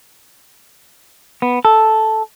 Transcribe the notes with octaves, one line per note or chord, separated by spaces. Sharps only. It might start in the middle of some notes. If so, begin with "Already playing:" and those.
B3
A4